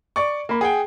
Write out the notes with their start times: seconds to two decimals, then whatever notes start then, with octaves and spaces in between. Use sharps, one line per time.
0.16 D5 C#6
0.49 A#3 B5
0.61 G#4 F#5 G5